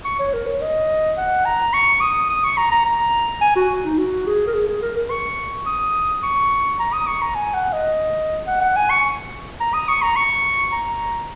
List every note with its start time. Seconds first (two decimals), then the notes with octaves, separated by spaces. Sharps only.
0.05 C#6
0.19 C#5
0.33 A#4
0.47 C#5
0.61 D#5
1.18 F#5
1.45 A#5
1.73 C#6
2.01 D#6
2.29 D#6
2.44 C#6
2.57 A#5
2.72 A#5
2.85 A#5
3.41 G#5
3.56 F#4
3.84 D#4
3.99 F#4
4.27 G#4
4.47 A#4
4.54 G#4
4.69 G#4
4.82 A#4
4.96 A#4
5.10 C#6
5.66 D#6
6.23 C#6
6.79 A#5
6.93 D#6
7.07 C#6
7.22 A#5
7.35 G#5
7.54 F#5
7.73 D#5
8.47 F#5
8.61 F#5
8.76 G#5
8.90 C#6
9.60 A#5
9.74 D#6
9.88 C#6
10.02 A#5
10.16 C#6
10.72 A#5